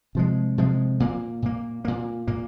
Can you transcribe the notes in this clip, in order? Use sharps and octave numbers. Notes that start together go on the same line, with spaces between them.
C3 F3 G#3
C3 F3 G#3
A#2 A#3
A#2 A#3
A#2 A#3
A#2 A#3